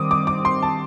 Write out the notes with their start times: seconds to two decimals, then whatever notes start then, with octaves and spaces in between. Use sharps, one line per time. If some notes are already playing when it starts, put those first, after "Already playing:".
Already playing: D#3 G3 C4 D6 D#6
0.11 D6
0.27 D6
0.45 C6
0.63 A5